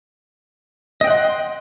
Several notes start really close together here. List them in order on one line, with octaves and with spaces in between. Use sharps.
D#5 G5 F#5 C6